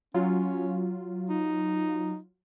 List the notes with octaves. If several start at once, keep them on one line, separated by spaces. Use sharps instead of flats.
F#3 C#4 F4
D#4